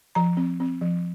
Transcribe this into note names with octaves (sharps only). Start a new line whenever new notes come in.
F3 A#5
C4
C4
F3